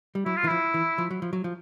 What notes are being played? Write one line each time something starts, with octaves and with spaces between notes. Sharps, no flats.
G3
F#3 E4
F4
E3
F3 E4
E3
F3
F#3
F3
F#3
F3